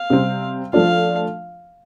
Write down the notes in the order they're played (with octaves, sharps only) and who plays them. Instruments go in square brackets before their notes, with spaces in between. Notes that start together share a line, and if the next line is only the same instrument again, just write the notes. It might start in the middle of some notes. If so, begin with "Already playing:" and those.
Already playing: [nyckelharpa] F5
[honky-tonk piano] C3 G3 C4
[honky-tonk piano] F3 A3 D4 F4 [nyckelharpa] F5